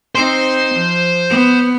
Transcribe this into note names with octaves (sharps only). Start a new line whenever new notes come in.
C4 D#4 C5
F3
B3